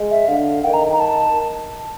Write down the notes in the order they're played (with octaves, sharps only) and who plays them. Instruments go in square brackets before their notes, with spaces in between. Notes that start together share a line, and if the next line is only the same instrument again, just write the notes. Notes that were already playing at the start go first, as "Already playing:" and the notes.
Already playing: [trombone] G#3
[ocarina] E5
[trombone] D3 [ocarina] F5
[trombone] D#3 [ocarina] G5
[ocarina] A#5
A#5
A5